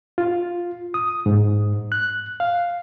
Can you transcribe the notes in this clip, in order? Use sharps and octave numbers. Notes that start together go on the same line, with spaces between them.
F4
D#6
G#2
F#6
F5